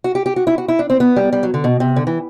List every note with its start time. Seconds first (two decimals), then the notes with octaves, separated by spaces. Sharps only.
0.04 F#4
0.15 G4
0.26 G4
0.36 F#4
0.47 E4
0.58 F#4
0.68 E4
0.79 D4
0.90 C4
1.00 B3
1.16 G3
1.33 G3
1.43 F#3
1.54 D3
1.64 B2
1.80 C3
1.96 D3
2.07 E3